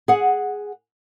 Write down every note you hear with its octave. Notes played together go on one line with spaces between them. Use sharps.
G#4 F#5